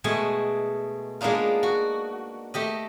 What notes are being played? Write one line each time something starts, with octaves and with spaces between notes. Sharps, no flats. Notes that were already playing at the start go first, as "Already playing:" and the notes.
B2 G#3 A3 G#4 G#5
G#3 A#3 B3 D4 D#4 F4
F#4
A3 G4 D#5